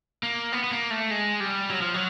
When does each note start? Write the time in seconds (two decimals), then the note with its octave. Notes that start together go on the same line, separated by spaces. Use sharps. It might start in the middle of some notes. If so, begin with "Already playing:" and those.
0.23 A#3
0.52 B3
0.64 B3
0.71 A#3
0.91 A3
1.11 G#3
1.40 G3
1.70 F#3
1.81 F3
1.94 F#3